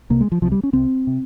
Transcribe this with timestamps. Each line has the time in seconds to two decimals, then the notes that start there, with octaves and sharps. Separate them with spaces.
0.10 C2 C3 A#3
0.21 G#3
0.32 F3
0.42 C2 C3 F3
0.52 G3
0.63 C#4
0.73 C2 C3 C4
1.07 C3